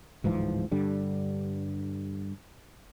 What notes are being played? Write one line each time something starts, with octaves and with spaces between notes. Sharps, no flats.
D1 G#2 E3 F3
G2 D3 G3